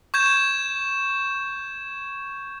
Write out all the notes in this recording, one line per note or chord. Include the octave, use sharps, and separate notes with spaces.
C#6 G6 G#6 E7